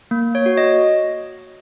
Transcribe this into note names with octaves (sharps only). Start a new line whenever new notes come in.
A#3
C#5
F#4
D#5